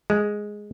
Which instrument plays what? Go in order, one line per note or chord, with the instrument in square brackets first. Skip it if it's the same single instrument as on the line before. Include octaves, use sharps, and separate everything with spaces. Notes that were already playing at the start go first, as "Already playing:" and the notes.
[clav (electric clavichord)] G#3